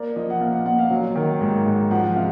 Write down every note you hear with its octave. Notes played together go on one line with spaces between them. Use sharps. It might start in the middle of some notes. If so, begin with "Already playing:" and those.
Already playing: A#3 D5
F3 D#5
F#5
A#2 F5
F#5
A#2 F#5
F5
F#3
D#3
G#2
G#2
F3 F#5
C3 F5